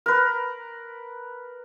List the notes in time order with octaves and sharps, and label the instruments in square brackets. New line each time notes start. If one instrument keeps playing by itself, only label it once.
[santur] A#4 B4